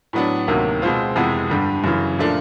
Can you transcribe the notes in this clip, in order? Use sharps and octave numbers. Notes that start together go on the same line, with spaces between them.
A2 F#3 B3 D4
D2 C3 D#3 F#3 A#3
B2 G#3 C4 F4
F2 C3 E3 G#3 B3
G2 D3 G3
F#2 C#3 E3
A#2 F3 A3 D4 F4